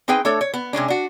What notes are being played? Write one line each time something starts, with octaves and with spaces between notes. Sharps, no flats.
C4 D#4 G#4 B4 G5
A3 D4 A4 C#5
C#5
B3
C3 G#3 C#4 D4
D4 F#4